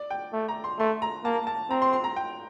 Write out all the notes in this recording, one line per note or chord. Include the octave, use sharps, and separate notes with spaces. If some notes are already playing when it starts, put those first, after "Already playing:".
Already playing: D5
G5
A3
A#5
C6
A3 C6
A#5
A#3 A5
A5
C4 A#5
C6
C6
A#5
G5